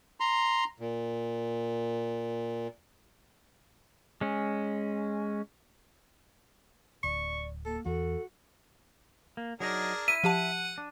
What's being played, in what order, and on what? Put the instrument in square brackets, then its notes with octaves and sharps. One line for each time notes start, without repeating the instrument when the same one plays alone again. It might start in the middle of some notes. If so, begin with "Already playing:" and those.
[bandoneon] A#5 C6
A#2
[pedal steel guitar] G#3 C#4
[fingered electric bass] D1 [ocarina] D5 [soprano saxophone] C#6
[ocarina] A#3 [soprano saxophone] A4
[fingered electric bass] E2 [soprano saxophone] F#4 [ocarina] A4
[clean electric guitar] A#3
[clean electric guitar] F#3 D#4 D#5 [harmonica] D4 G#4 A#4
[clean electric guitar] E4 E5 [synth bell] D#7
[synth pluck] F3 G4 A5 [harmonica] F#5
[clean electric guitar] D4